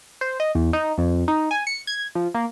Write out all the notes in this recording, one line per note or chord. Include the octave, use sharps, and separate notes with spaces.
C5
D#5
E2
D#4
F2
D#4
G#5
C#7
G#6
F3
A#3